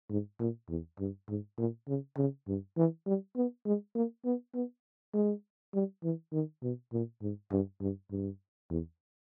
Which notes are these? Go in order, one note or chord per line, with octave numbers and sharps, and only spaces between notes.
G#2
A#2
E2
G2
G#2
A#2
C#3
C#3
G2
E3
G3
B3
G#3
A#3
B3
B3
G#3
G3
E3
D#3
B2
A#2
G#2
G2
G2
G2
E2